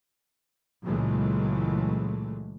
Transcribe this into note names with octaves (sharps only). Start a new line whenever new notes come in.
C#2 A#2 E3 F#3 G#3 A3